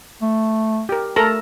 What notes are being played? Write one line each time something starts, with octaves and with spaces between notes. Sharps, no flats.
A3
G4 A#4
A3 A4 A#4 A#5